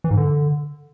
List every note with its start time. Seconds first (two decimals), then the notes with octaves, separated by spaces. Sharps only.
0.04 E3
0.11 G#2
0.17 D3